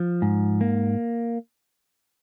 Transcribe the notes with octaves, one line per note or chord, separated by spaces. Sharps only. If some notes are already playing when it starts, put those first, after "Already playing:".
Already playing: F3
G#2
A#3